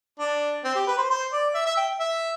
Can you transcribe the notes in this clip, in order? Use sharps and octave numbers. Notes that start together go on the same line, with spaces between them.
D4
C4
G4
B4
C5
C5
D5
E5
E5
G5
E5